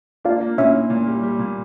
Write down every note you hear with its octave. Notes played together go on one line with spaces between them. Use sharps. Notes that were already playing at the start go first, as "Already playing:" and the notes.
A#3 D4 F4
A#3
A#2 C#4 E4
A#2
A#2
G3
G3
A#2